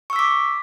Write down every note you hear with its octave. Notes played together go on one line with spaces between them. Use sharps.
C#6 D6 E6 B6